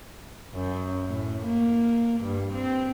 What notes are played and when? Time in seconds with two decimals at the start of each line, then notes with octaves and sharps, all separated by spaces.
0.53 F#2
1.09 A2
1.45 A#3
2.21 G2
2.54 C4